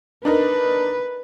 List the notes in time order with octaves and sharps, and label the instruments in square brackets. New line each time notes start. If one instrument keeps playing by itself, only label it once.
[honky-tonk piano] D4 D#4 A#4 [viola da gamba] B4